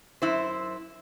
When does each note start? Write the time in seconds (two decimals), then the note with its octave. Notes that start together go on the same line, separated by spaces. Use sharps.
0.22 F#2 E4 C5